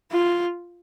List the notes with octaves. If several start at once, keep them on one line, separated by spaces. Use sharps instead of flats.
F4